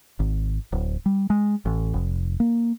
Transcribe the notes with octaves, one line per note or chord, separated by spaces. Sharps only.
G#1
D1
G3
G#3
A1
F1
A#3